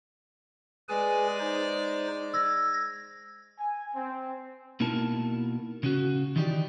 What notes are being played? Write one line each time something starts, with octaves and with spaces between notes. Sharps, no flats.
G#3 G#4 B4 D5 G#5
D#4 C5
E6 G#6 A#6
G#5
C4
B2 A#3 D#4 E4 A#4 A5
C#3 C#4 F#4
D#3 E3 D#4 E4 G4 D5